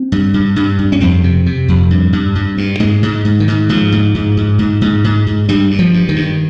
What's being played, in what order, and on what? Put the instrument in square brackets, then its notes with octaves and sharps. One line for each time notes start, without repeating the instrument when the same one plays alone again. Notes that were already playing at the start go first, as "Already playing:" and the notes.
Already playing: [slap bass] C4
G2
G2
G2
G2
C#4
F2 C4
C3
C3
F2
G2
G2
G2
G2
G#2 G#3
G#2
G#2
D#3
G#2
G#2 F3
G#2
G#2
G#2
G#2
G#2
G#2
G#2
G2 G3
G2
F3
G2
D#3
G2